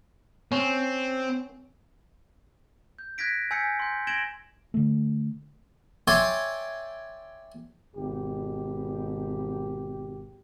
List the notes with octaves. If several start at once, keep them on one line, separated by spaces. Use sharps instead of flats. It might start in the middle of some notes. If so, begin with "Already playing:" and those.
C4 C#4
G6
F#6 G#6 A#6 B6 D7
G#5 E6 G6 G#6 B6 C#7
C6 G6
G#6 A#6 D7 E7 F#7 G7
D3 A3
C#5 D5 E5 G5 G#5 C6
G#1 B2 G4